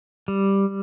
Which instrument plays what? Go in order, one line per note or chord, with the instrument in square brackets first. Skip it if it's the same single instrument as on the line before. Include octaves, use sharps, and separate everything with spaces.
[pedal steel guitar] G3